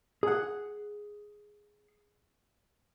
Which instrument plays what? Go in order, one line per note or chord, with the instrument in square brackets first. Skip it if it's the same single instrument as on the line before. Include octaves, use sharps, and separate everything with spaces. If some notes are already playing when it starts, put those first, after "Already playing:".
[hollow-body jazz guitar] G#4 F#5